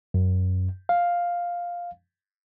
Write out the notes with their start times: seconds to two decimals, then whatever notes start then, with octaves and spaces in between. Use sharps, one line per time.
0.14 F#2
0.89 F5